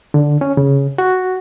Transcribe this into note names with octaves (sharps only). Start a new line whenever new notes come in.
D3
C#4
C#3
F#4